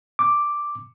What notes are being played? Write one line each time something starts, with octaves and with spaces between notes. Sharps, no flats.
D6